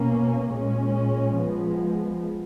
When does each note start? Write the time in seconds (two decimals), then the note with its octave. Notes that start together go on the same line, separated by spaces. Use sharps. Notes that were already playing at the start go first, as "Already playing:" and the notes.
Already playing: B2 A#3 C#4
0.50 A#2 G#3 C#4
1.35 F3 G#3 B3